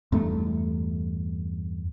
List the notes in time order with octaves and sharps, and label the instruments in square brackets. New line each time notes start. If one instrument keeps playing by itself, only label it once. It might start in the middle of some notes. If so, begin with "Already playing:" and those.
[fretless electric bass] E2 G2 A3